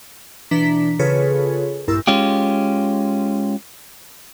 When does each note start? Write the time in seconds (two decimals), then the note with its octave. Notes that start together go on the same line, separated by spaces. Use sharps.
0.51 B2 E3 D4 A#5 B6
0.99 C#3 F4 G#4 A4 B4 C#5
1.88 A#1 G2 E4 A#4 E6
2.07 G#3 C#4 F4 G4